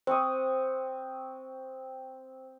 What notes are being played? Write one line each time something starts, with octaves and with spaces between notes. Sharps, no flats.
C4 C5 C#6 D#6